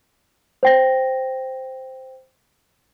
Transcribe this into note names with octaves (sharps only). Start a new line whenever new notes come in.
C5 G5 A#6